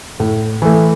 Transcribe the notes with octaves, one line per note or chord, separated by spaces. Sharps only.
A2
E3 A3